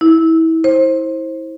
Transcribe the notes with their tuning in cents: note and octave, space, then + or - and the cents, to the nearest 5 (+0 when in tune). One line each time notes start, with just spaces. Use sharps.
E4 -30
C5 +20